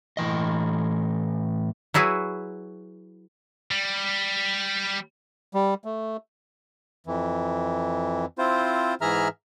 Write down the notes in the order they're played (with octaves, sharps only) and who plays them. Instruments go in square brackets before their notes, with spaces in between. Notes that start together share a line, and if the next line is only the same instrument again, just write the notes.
[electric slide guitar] A2 E3 D#5
[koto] F#3 E4 F#4 G#4 B4
[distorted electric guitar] G3
[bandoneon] G3
A3
F2 E3
C4 E4 F4 C5
G#2 E3 G#4 E5 A#5 F6